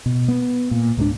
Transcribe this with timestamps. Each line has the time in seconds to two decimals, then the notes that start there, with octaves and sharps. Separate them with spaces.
0.06 B2
0.28 B3
0.71 A#2
0.97 C#2 G#2 G3 D4